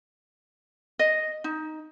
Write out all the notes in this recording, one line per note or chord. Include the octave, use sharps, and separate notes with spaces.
D#5
D#4